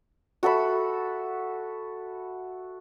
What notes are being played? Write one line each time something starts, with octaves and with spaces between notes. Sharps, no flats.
F#4 A4 E5 B5